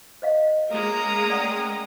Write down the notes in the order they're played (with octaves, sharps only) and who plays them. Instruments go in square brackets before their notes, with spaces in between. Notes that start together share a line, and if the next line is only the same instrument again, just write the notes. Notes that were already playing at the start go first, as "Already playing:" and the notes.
[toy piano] C5 D#5 F5
[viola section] G#3 A#3 C#4 [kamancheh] A#5 D#6
[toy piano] D5 F#5 G5